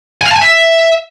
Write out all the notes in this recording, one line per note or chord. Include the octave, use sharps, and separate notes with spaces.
G#5
F5
A5
G#5
E5